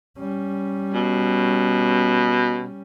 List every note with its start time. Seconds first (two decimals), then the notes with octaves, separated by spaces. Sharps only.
0.18 G3 C#4
0.94 B2